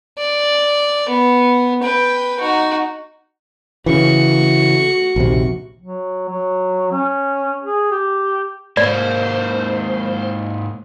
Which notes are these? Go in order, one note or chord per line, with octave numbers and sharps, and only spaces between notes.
D5
B3
B4 G5
D#4 F#4
C#3 E3 F#4 C#6
A#1 D#2 C3
F#3
F#3
C#4
G#4
G4
G#2 A#3 C5 D5